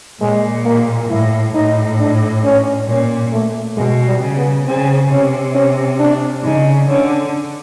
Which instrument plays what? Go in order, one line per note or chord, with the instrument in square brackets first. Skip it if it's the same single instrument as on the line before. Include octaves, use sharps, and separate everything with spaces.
[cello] A#2 [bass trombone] G#3
[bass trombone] A#3
[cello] A2 [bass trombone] E4
[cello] A2 [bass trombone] D#4
[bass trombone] D4
C#4
[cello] A#2 [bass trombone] C#4
[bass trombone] A3
[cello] B2 [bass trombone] G#3
[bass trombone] G3
[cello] C#3
[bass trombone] B3
[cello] C#3 [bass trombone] C4
[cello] C3 [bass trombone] C#4
[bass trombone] C#4
D4
[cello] C#3 [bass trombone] D#4
[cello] D3 [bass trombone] C#4